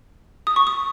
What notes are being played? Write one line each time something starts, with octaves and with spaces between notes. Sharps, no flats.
D#6
C#6
D#6